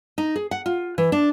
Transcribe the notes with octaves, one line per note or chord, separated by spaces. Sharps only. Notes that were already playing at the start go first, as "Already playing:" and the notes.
D#4
G#4
F#5
F4
E3
D4